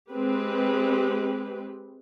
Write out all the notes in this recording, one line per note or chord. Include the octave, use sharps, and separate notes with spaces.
G#3 C4 G4 B4